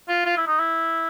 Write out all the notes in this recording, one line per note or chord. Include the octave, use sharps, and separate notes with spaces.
F4
F4
E4
D#4
E4